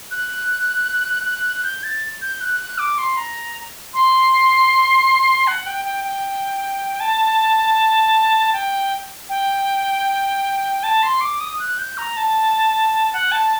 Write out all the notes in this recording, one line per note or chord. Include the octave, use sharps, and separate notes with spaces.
F#6
G6
A6
G6
F#6
F#6
D6
C6
A#5
C6
F#5
G5
G5
G5
A5
G5
G5
A5
C6
D6
D#6
F#6
G6
A#5
A5
F#5
A5